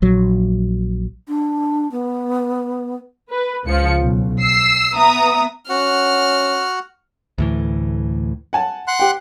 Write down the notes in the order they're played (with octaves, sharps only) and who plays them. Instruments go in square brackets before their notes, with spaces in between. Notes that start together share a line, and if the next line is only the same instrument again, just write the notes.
[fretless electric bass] A#1 F#3
[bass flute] D4
B3
[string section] B4
C#2 F3 C#7
B1
E6 C7
B3 E5 A#5 D#6
[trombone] C#4 [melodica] F#4 F#5 [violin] F6
[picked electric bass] D2 A2 E3
[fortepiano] F#5 G#5 A5
[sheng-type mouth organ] F#5 C6 F#6
[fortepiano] G4 G5